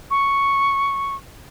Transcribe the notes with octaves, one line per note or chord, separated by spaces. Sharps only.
C#6